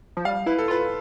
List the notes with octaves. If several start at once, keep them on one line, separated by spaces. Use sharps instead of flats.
F3
G3 F5
E4 B4
A4
F4
B4